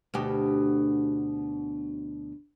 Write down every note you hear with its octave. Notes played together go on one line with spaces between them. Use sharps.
D2 B2 G4